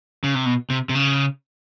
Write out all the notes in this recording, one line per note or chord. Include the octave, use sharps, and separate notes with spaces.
C#3
C3
B2
C3
C3
C#3